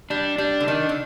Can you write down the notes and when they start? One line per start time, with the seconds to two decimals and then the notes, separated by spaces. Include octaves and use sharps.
0.10 G3 D4
0.38 G3 D4
0.60 D3
0.68 D#3 D4
0.89 D3